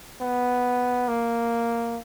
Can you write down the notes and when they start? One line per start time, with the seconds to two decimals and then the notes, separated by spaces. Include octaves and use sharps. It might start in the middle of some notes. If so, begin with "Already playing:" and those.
0.22 B3
1.08 A#3